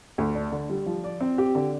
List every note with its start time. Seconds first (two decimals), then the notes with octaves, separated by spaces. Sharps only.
0.18 D2
0.35 D4
0.52 D3
0.70 G3
0.86 F3
1.04 D5
1.21 C4
1.38 G4
1.55 D3